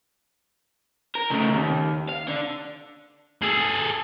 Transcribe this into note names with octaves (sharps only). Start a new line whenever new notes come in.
A#4
C#3 A3
D#2
F5
D3
G#4 A4